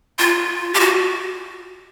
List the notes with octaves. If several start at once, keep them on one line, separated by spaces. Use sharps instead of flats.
F4
G4
F#4